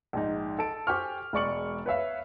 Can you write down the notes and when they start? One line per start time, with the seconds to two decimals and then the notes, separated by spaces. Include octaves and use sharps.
0.13 A#1 G#2 D#4
0.59 A4 A5 D7
0.87 G4 C5 G5 G#5 C#6 F6
1.33 E1 G#3 D5 C#6 C#7 F#7
1.86 B4 C#5 E5 F5